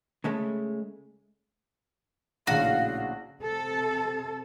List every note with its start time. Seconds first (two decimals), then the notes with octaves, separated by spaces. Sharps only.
0.24 C#3 G#3 A3
2.47 A#1 A2 C#3 F#4 F5
3.41 C3 A4